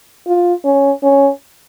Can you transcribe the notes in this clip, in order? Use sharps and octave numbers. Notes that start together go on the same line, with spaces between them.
F4
C#4
C#4